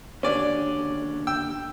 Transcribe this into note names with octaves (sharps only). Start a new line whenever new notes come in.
D#2 D3 C#4 D5
G5 E6